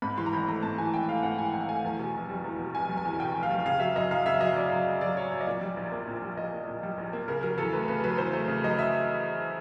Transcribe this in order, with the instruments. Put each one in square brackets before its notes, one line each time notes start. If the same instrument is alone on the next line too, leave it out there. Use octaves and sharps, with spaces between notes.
[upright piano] G#2 B5
E3 C6
A#5
G#1 B5
A3 A#5
G#2 A5
E3 G#5
G#1 G5
A3 F5
G#2 F#5
E3 G#5
G#1 G#5
A3 G#5
E2
B2
F1
G3
E2
B2
F1 G#5
G3
G#5
E2
B2 G5
F1
F5
G3
C#3 F5
F#3 E5
F#2 D#5
F#2 F5
C#3 E5
F#3 D#5
F#2 D5
F#2
C#3
F#3 D5
F#2 C#5
F#2 C#5
D#5
A#2 D5
G3
A#1
A#3
A#2
G3
A#1 D#5
A#3
A#2
G3
A#1
A#3
C#3 A#4
F#3 A#4
E2 A4
A3 B4
C#3 B4
F#3 B4
E2 C5
A3
C#3
F#3 D#5
E5